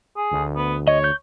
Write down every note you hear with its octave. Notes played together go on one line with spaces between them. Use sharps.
G#4
D2
B3
C#5 D#5
G6